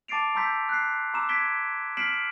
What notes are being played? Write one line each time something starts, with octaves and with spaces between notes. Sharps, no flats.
A5 D6 A6 C7 D7 F7
A5 A#5 C6 E6 G6 B6
F#6 C7
A#5 C6 D6 E6 E7
G#6 B6 D7 G7
F6 B6 C7 D7 E7 F#7